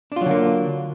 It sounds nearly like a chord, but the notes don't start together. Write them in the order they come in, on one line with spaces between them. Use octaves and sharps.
D4 F4 F#3 D3 A#3